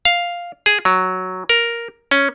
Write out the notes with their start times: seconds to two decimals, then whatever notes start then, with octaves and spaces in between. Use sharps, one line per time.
0.05 F5
0.66 G#4
0.85 F#3
1.49 A#4
2.11 C#4